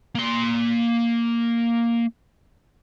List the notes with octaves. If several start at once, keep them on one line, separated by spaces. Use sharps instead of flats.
A#3 C6